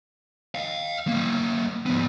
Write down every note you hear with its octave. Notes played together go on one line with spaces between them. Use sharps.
D#5 F5
A#3 C#4
F3 B3